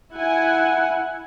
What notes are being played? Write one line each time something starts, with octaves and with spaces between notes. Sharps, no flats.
E4 F#5 G#5